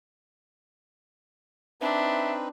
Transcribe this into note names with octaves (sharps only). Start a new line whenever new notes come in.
C4 D4 D#4 B4 E5